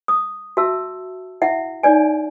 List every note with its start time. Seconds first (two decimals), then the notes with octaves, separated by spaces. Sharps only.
0.08 D#6
0.57 F#4 E5 A5 E6
1.42 E4 E5 F#5
1.83 D#4 C#5 D5 G#5